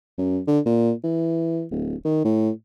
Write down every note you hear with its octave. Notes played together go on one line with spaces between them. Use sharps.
F#2
D3
A#2
E3
D1
D#3
A2